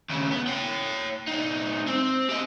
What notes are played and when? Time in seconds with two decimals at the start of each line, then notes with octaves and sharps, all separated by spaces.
0.09 D#2 C#3
0.31 B3
0.47 C#5 G5
1.28 C2 D#4
1.88 C4
2.29 G4 D#5